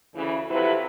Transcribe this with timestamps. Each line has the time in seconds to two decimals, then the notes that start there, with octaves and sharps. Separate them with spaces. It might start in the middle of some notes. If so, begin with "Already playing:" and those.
0.15 D2 C#3 E3
0.50 F2 C3 F3 F#3 E4 B4